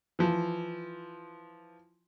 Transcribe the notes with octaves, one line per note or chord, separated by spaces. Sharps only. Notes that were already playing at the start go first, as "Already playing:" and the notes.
E3 F3